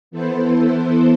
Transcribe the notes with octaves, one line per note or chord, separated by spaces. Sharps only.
E3 B3 E4 A4 C5